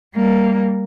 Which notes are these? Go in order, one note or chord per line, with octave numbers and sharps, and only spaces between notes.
G3 A#3